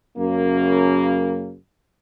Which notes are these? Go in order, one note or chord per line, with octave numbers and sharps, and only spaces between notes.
F#2 C#3 A#3